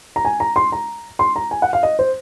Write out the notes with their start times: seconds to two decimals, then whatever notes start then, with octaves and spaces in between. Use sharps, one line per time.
0.16 A#5
0.25 G#5
0.40 A#5
0.56 C6
0.72 A#5
1.19 C6
1.36 A#5
1.51 G#5
1.62 F#5
1.73 F5
1.83 D#5
1.99 C5